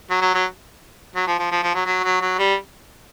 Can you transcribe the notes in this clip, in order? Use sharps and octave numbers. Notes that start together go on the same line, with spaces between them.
F#3
F#3
F#3
F#3
F3
F3
F3
F3
F#3
F#3
F#3
F#3
G3